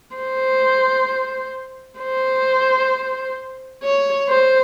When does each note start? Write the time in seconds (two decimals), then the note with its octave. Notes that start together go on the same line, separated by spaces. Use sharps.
0.16 C5
2.00 C5
3.83 C#5
4.29 C5